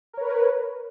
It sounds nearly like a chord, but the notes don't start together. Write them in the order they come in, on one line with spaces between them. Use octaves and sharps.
A#4 C#5 B4